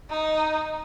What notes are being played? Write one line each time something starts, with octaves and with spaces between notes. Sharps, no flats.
D#4